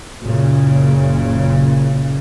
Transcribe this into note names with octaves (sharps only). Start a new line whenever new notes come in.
F#1 A#2 C#3